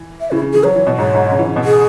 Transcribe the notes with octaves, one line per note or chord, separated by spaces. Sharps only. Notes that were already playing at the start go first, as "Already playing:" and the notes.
Already playing: E3
E5
C#3 E4
C#3
E3 G#4
F#3 C#5
E3
B2
G#2 C#5
G#2
C#3
E3
C#3
B2
G#4